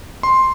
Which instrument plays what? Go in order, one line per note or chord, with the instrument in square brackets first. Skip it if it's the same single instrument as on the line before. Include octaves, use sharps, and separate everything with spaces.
[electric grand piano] C6